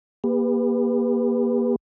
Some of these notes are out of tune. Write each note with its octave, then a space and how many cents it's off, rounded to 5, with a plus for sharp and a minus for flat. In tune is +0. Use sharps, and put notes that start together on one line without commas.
A#3 +30 G4 +40 B4 +0